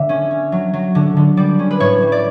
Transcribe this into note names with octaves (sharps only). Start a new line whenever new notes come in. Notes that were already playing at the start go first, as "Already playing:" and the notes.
Already playing: D3 E5
C#4
C#4
F#3
F#3
D3
D3
G3 D5
C#4
B4
A2 C#5
G3
D5